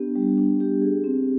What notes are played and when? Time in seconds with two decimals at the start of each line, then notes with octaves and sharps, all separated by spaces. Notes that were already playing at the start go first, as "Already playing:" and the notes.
Already playing: B3 D4 G4
0.15 G3
0.37 D4
0.60 G4
0.82 G#4
1.04 C4